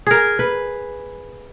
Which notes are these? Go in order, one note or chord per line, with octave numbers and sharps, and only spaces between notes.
G#4 A#4
B4